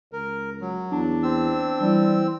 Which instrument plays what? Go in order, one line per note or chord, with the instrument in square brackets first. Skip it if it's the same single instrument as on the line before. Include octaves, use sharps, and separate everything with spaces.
[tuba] C#2 [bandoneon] A#4
[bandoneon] F#3
[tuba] E2 [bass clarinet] D4
[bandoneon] C4 E6
[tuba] E3 [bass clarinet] G3